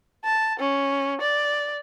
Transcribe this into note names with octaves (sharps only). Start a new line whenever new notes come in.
A5
C#4
D5